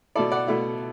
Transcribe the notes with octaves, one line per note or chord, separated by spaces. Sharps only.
B2 A3 E4 A4 D5
D5 F#5
B2 A3 E4